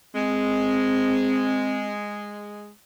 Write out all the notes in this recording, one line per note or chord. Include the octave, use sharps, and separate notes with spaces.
G#3 C4